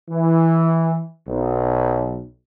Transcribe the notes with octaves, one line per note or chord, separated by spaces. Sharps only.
E3
B1